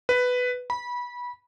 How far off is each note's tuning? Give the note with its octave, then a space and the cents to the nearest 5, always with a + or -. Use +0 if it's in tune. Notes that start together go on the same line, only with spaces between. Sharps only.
B4 +5
B5 -20